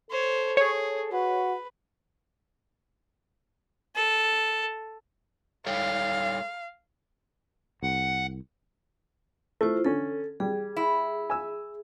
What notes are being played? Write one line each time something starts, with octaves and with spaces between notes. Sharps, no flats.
A4 C5 C#5
G#4 C#5
F#4 B4
A4
G3 A4 C#5 F5
C2 F#5
A3 E4 F4 C5
D3 C#4 A4
G3 G#4
E4
G#5 E6